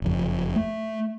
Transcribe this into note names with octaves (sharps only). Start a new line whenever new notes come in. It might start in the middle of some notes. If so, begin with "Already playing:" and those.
F#1 F2
A3